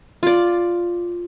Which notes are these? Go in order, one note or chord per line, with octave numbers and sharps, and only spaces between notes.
F4 D5